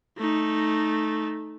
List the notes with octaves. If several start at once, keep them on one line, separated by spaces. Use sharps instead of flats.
A3 D#4